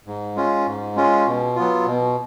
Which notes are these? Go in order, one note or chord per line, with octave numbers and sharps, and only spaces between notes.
G#2
G#3 C#4 F4
G#2
G#3 C#4 F4
B2
F#3 B3 F4
B2